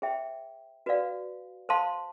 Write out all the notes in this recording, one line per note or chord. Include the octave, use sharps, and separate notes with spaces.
G#4 C5 E5 G5
F#4 B4 D5 F5
C5 F5 A5 C6